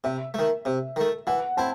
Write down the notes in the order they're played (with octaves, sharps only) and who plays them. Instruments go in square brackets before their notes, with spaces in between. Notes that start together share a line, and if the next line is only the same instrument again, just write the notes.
[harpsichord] C3 [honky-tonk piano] E5
[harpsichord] D#3 A3
C3
D#3 A3
[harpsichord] E3 [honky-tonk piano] F#5
[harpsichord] C4 E4 [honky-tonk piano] A5